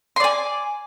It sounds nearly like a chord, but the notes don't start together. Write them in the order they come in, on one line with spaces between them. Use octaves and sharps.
C6 D5 G#5